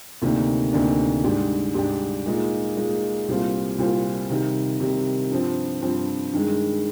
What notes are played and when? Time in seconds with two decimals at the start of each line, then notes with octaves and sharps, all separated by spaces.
0.22 D2 C3 D#3 A#3 D4
0.73 D2 C3 D#3 A#3 D4
1.24 G#2 G3 D4 G4
1.74 G#2 G3 D4 G4
2.26 A#2 G#3 D#4
2.76 A#2 G#3 D#4
3.28 C2 A#2 G3 C4 F4
3.78 C2 A#2 G3 C4 F4
4.30 C3 D#3 G3
4.80 C3 D#3 G3
5.31 G2 F3 C4
5.82 G2 F3 C4
6.33 G2 D#3 G#3